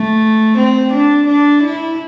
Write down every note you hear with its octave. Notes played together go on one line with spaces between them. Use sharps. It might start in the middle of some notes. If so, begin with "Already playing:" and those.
Already playing: A3
C4
D4
D4
E4